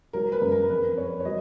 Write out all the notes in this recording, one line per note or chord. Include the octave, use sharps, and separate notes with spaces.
F#3 A#4
B4
F#2
A#4
F2 B4
F2 C#5
C#5
F#3 D#5